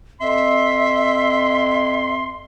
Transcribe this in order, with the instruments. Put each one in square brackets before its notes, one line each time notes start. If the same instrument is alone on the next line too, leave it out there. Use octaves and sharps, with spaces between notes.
[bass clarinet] F2 [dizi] E5 [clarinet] C6